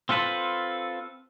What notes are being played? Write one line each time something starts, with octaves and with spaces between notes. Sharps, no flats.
C4 F4 A4 B4